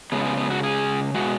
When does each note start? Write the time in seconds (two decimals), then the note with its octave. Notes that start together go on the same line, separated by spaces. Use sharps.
0.12 C#3 G#3 B3
0.25 B3
0.37 B3
0.50 F#4
0.63 G#4
1.14 B2 G#3 F#4